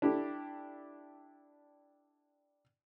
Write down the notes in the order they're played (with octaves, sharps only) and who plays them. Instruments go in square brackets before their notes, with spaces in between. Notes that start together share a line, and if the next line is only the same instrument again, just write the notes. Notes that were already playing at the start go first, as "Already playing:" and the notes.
[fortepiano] D4 E4 G4 A4